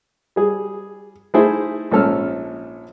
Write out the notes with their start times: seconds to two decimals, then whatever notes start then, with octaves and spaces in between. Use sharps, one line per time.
0.36 G3 G#4
1.34 A3 D#4 E4 G#4 C5
1.91 A#1 G#2 C#4 A4 E6 F6